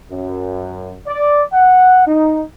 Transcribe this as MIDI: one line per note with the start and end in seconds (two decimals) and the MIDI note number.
0.10 0.95 42
1.07 1.44 74
1.53 2.06 78
2.06 2.42 63